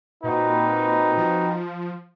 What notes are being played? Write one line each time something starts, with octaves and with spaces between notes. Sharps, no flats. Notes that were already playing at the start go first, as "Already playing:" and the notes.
A#2 C4 D#4 F#4 B4
F3